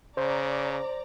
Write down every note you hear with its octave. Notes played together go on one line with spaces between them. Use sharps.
C#3 C5 D5 A#5